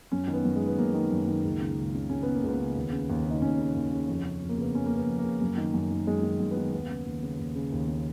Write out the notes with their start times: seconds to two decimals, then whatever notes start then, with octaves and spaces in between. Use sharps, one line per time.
0.12 F#2 C#4
0.28 D#3
0.33 B3
0.45 F#2
0.56 G#3
0.61 D#3
0.67 B3
0.78 F#2 A#3
0.94 D#3
1.11 F#2
1.28 D#3
1.44 C#2
1.61 C#3
1.78 C#2
1.94 C#3
2.10 C#2 C#4
2.23 C#3 B3
2.35 A#3
2.43 C#2 B3
2.59 C#3
2.76 D#2
2.92 C#3
3.10 D#2
3.26 C#3 D#4
3.42 D#2 C#4
3.58 C#3
3.75 D#2
3.93 C#3
4.08 F2
4.24 C#3
4.42 F2
4.49 A#3
4.58 C#3 B3
4.75 F2 C#4
4.86 A#3
4.92 C#3
4.97 B3
5.07 F2
5.19 A#3
5.24 C#3
5.41 F#2
5.57 D#3
5.74 F#2
5.91 D#3
6.07 F#2 G#3
6.23 D#3
6.40 F#2
6.51 B3
6.57 D#3
6.73 D#2 B3
6.89 C#3
7.06 D#2
7.23 C#3
7.39 D#2
7.55 C#3
7.72 D#2
7.89 C#3